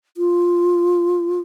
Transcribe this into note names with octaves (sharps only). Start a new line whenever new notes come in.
F4